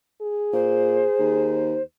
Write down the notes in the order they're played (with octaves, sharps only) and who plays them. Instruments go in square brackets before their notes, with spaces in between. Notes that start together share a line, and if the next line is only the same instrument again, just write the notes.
[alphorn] G#4
[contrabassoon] A#2 [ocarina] C5
[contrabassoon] D#2